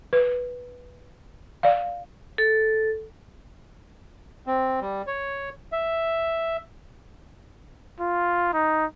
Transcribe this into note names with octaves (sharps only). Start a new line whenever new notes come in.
B4
D5 F5
A4
C4
G3
C#5
E5
F4
D#4